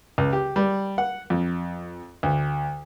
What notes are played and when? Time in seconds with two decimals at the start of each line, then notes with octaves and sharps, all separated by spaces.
0.18 C#2
0.33 G4
0.56 G3
0.98 F#5
1.30 F2
2.23 D2